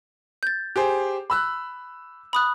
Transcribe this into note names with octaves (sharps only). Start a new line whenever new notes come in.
G6 A6
G4 G#4 C5
B5 E6 F#6
B5 D#6 F#6